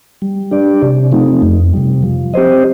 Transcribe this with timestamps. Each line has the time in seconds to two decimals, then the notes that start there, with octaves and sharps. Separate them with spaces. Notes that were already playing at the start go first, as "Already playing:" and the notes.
0.22 G3
0.51 D4 G4 D5
0.82 C3
1.12 F3 A3 C4 D#4
1.42 F2
1.73 C3 G3
2.03 F3
2.34 C4 G4 C5 D#5